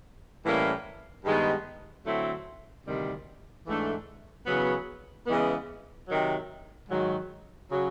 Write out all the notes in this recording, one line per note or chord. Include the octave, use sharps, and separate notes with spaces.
A2 E3 G3 A#3 C#4
G2 D#3 G#3 B3
D3 F#3 A3 C4 E4
D2 C3 D#3 G3
G#2 E3 A3 D4
E2 C#3 F#3 B3
C#3 E3 G#3 B3
C3 D#3 F#3
G#2 D#3 F#3
C#3 F#3